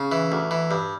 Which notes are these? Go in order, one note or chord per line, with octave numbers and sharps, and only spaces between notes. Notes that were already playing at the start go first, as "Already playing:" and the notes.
Already playing: C#3
E3
D2
E3
G2